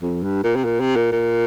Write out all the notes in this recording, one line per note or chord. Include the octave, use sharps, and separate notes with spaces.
F2
G2
A#2
C3
A#2
C3
A#2
A#2